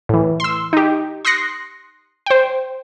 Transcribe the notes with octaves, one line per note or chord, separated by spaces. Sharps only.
A2 E3
C6 E6
D#4 G4
C6 D#6 F#6 A#6 C7 C#7
C5 G5